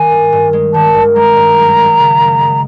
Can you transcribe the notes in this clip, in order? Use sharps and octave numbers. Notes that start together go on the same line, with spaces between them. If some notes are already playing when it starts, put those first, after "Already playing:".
Already playing: D#3 G#5
G2
G2
G#3
D#3 A5
G2
G#3 A#5
G2
F#2
G#3
C#3
F#2
G#3